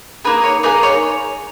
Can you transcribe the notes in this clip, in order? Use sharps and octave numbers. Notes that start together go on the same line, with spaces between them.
A#3 D#4 G#4 B4
C#5
A#3 D#4 G#4 B4
C#5